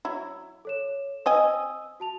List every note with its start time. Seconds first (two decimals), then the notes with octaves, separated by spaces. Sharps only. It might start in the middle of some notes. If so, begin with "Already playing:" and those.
0.05 F#3 E4
0.65 A4 C#5 E7
1.26 C4 D#5 G#5 D#6 E6
2.00 F#4 A5 F7